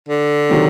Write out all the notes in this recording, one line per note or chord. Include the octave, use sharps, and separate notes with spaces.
D3
C3 D#3 F#3